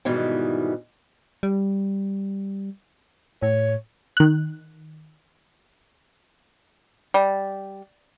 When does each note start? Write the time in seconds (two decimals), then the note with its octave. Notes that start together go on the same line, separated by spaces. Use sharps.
0.05 G#2 B2 D#3 E3 G3
1.43 G3
3.42 A2 C#5
4.17 D#3 F#6
7.14 G3